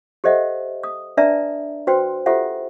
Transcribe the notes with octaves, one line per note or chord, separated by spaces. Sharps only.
G4 A4 C5 D#5 E5 F#5
D#6
D4 B4 D5 E5 A5 A#5
F#4 B4 C5 G5 C6
F4 G4 A4 C5 E5 F#5